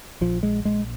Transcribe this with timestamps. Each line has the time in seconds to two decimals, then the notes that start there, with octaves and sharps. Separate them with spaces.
0.21 A#1 F3
0.43 G#3
0.65 A#1 G#3